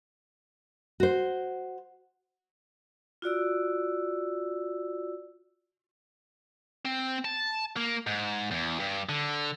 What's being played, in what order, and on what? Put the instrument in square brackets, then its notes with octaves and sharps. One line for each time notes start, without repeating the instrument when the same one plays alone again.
[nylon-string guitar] F#4 C5
[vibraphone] F4 F#4 D5 E6
[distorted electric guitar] C4
A5
A#3
G#2
E2
G2
D3